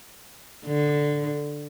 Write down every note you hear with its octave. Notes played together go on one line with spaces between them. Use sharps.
D3